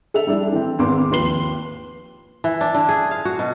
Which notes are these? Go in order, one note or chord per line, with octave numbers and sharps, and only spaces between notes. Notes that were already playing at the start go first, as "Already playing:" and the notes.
A4 E5 F7
G3 D4 E4
E3 C4
G#1 E2 B3 C6 D6
D#2 F3 B4 C6 C7 G7
E3
D4
D3
G#4
F5
F#4
B2